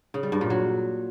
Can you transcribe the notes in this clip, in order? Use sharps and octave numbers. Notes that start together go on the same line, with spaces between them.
C#3
G3
G2
A#2
F#3